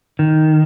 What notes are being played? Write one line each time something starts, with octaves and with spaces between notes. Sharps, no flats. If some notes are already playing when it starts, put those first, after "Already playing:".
D#3